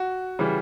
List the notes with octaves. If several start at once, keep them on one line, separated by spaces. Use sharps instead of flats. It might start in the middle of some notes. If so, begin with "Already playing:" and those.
Already playing: F#4
C#3 E3 G3